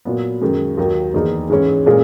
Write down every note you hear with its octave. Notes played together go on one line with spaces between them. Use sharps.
A#2 F#3 B3
F#2 D#3 G#3
D#2 D#3 F#3
E2 D#3 A#3 D#4 G#4
G#2 E3 G#3 C#4
A#2 G#3 C#4 G#4